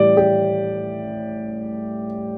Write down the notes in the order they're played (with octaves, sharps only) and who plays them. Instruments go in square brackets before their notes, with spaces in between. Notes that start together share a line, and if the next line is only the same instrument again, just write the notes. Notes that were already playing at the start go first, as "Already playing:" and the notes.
Already playing: [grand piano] A2 E3 G3 G4 D5
G4